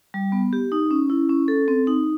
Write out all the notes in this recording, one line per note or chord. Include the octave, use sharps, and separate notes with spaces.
G3
B3
G4
D#4
C#4
E4
C#4
A4
C4
D#4